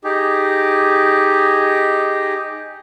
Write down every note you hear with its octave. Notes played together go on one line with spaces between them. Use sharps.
D#4 G4 G#4